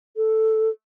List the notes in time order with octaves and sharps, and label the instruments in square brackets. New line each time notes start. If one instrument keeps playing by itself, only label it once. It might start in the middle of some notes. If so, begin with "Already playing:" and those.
[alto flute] A4